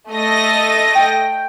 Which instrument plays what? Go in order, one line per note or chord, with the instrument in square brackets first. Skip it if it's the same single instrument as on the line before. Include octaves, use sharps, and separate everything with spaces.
[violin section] A3 D#5 A#6
[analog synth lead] G5